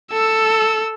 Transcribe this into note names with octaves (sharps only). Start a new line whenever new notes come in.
A4 E6